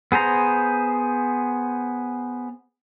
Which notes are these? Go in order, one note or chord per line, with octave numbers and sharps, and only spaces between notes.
B3 G#4 C5 A#5